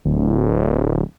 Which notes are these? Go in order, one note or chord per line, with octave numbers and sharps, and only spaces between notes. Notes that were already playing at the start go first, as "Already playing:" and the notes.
D1